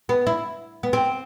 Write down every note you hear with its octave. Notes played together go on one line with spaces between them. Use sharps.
B3
E4
B3
C4